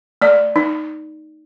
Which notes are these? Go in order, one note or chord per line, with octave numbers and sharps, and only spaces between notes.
A3 D5
D#4